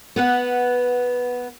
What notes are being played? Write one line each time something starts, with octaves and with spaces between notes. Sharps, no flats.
B3 B4 F#5